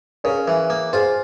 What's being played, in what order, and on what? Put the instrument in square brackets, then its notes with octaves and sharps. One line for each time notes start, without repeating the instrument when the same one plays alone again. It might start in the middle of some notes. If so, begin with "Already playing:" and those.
[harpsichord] C#3 [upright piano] A#4 C#5
[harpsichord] E3
A#3
[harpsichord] F4 [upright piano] G#4 C5